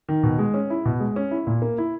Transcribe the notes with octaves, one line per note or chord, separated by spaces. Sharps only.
D#3
B2
G#3
C#4
E4
B2
G#3
C#4
E4
A#2
A#3
E4